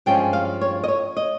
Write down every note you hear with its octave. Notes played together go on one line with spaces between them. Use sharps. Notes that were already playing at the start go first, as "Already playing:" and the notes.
G2 F3 G#3 C#4 G5
F5
C#5
D#5
C#5
D#5